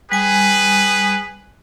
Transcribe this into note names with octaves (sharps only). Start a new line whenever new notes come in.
G3 G#4 B4 G#5